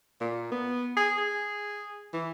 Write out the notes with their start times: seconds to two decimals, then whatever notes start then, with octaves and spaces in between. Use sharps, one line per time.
0.21 A#2
0.52 B3
0.96 G#4
1.17 G#4
2.13 E3